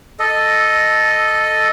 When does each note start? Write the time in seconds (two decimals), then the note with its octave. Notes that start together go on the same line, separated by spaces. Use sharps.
0.19 A4 D#5